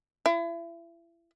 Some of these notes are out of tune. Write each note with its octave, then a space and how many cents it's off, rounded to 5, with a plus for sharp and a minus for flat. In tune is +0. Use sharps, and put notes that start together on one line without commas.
E4 +35